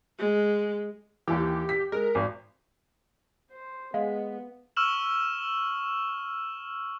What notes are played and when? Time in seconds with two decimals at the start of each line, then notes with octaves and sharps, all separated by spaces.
0.19 G#3
1.28 D#2 E3 G4
1.69 B6
1.92 G#3 A#4
2.15 G#1
3.51 C5
3.94 G#3 B3 F5
4.77 C#6 E6 F6 E7 F#7